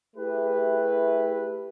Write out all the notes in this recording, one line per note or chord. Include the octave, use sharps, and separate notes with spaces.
A3 E4 G4 G#4 B4